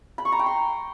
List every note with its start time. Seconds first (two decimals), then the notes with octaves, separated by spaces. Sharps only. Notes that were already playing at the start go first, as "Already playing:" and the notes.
0.18 B5
0.25 C#6
0.32 A#5
0.39 G5
0.46 C6